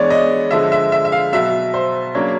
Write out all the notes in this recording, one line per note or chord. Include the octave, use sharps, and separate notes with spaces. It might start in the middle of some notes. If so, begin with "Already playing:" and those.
Already playing: E3 G#3 B3 D4 C#5 D5
D#5
D3 F3 G#3 E5
E5
E5
E5
F5
B2 F#3 B3 E5
C5
C#3 F#3 A#3 D4 C#5